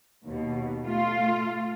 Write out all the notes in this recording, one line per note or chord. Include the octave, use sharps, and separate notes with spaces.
D#2 B2
A3 F4